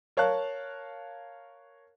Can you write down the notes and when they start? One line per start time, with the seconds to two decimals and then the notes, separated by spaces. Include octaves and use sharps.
0.17 A#4 C#5 F5 A5 F#6